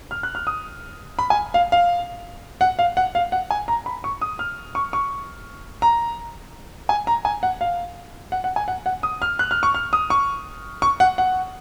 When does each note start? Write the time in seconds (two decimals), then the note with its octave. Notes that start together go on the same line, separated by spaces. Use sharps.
0.11 F6
0.23 F#6
0.35 F6
0.47 D#6
1.19 B5
1.30 G#5
1.54 F5
1.72 F5
2.61 F#5
2.79 F5
2.97 F#5
3.15 F5
3.32 F#5
3.51 G#5
3.68 A#5
3.86 B5
4.04 C#6
4.21 D#6
4.39 F6
4.75 C#6
4.93 C#6
5.82 A#5
6.89 G#5
7.07 A#5
7.25 G#5
7.43 F#5
7.61 F5
8.32 F#5
8.44 F#5
8.56 G#5
8.68 F#5
8.86 F#5
9.03 D#6
9.22 F6
9.39 F#6
9.51 F6
9.63 C#6
9.74 F6
9.93 D#6
10.10 C#6
10.82 C#6
11.00 F#5
11.18 F#5